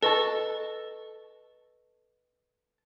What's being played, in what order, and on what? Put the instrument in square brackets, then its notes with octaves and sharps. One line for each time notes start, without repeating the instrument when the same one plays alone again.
[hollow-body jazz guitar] A4 A5 [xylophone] B4 D#5 C#6